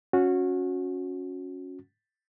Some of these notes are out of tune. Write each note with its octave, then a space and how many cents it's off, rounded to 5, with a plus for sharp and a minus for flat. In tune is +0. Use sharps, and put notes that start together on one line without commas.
C#4 +0 F#4 -20